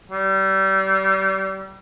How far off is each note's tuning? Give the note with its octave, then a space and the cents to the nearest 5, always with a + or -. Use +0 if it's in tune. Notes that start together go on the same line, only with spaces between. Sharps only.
G3 -30